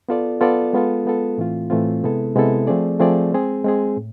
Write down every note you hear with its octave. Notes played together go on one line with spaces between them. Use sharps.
B3 F4 A4 D5
B3 F4 A4 D5
G#3 B3 F4 A4
G#3 B3 F4 A4
A2 E3 A3 C4 F4
A2 E3 A3 C4 F4
C3 G#3 B3 E4 A4
C3 G#3 B3 E4 A4
F3 A3 C4 G#4 D5
F3 A3 C4 G#4 D5
G#3 C4 G#4
G#3 C4 G#4
A2